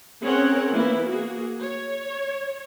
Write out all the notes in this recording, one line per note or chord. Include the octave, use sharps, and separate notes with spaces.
C4 C#4 G#4 A#4 C#5 F#5
E3 A#3 B3 E4
A#3 F#4 G#4
C#5